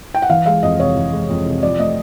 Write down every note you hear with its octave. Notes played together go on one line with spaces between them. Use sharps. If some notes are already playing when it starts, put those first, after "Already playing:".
G5
F#5
E3 F5
G#3 F5
F2 D#5
C3 C#5
E3
G#3
F2
C3
F3 D5
A3 D#5